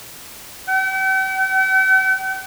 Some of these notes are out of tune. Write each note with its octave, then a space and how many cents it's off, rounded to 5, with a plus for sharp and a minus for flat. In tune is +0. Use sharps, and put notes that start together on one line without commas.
G5 -45